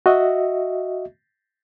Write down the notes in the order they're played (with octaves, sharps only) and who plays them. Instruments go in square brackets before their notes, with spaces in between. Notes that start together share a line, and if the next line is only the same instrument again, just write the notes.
[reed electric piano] F#4 D#5 E5